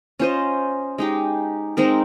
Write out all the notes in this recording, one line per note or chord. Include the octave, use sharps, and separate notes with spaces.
C#4 F4 C5 D#5
G#3 D#4 G4
G#3 C4 D#4 A#4